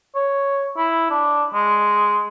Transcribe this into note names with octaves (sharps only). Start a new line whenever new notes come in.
C#5
E4
D4
G#3